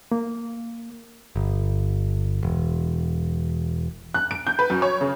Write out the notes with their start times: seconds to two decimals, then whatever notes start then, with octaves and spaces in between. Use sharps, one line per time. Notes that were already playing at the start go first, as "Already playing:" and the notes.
0.12 A#3
1.36 G1
2.43 E1
4.14 F#6
4.31 D7
4.47 G6
4.59 B4
4.70 F#2
4.82 C#5
5.01 C#3